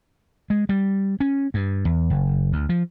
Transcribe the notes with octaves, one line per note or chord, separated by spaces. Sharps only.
G#3
G3
C#4
G2
E2
F#1
D2
F3